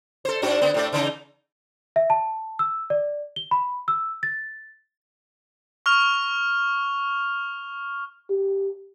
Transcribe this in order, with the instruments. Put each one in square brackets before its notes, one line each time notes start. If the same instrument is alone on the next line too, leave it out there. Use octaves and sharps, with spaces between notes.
[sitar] A4 C5
G#2 D4 F#4
D3 B3
A2 A3 D5
C#3 E3 D#4
[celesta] E5
A5
E6
D5
G7
B5
E6
A6
[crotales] C#6 F6 F7
[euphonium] G4